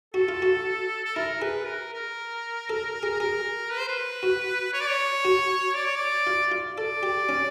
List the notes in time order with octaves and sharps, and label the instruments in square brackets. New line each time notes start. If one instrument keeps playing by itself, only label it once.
[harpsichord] F#4 [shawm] A4
[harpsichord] F4
F#4
[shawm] A4
[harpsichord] E4 [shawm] A#4
[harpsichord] G#4 [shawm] B4
[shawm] A#4
A#4
[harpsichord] A4
G#4
[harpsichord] G#4 [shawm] A#4
[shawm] B4
C5
B4
[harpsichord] F#4
[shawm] C#5
D5
C#5
[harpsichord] F#4
[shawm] D5
C#5
D5
[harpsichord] F4
F4
[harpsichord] A4 [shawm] D5
[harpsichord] G4
C#4